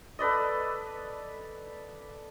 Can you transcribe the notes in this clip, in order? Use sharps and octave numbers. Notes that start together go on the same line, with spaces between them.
A4 B4 D5 D#5